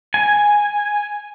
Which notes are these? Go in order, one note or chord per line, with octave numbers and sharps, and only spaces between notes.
G#5